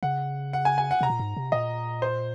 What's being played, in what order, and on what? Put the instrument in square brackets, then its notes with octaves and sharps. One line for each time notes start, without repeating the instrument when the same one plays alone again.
[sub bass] C#3 [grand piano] F#5
[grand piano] F#5
G#5
G#5
F#5
[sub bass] C3 [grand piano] A#5
[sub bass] A#2
G#2
C3
[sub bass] A#2 [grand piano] D#5
[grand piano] C5